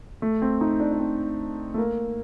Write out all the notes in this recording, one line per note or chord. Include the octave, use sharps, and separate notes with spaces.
A3
C4
D#4
D4
D4
C4
A3
A#3